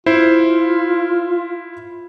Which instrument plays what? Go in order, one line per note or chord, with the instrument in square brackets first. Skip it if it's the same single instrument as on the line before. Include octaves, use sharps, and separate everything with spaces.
[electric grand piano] E4 C5 [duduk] F4